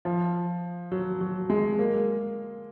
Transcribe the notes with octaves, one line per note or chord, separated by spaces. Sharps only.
F3
F#3
F#3
G#3
A#3